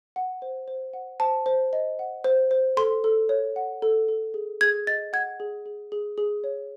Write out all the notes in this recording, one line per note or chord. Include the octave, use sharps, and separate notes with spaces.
F#5
C5
C5
F#5
C5 A5
C5
D#5
F#5
C5
C5
A4 C6
A4
C#5
F#5
A4
A4
G#4
G#4 G#6
D#5 A6
F#5 G#6
G#4
G#4
G#4
G#4
C#5